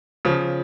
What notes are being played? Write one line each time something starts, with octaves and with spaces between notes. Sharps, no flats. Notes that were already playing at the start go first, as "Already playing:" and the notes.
C#3 F3